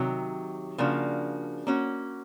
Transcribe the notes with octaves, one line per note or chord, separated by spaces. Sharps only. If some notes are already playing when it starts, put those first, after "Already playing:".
Already playing: C3 D#3 F#3
C#3 F3 A#3 D4 F#4
A#3 C#4 F#4